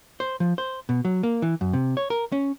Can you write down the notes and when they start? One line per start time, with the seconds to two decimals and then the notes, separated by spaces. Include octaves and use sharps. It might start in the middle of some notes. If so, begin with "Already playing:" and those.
0.20 C5
0.40 F3
0.58 C5
0.89 B2
1.05 F#3
1.23 A#3
1.42 E3
1.61 F#2
1.73 C3
1.97 C#5
2.10 A#4
2.32 C#4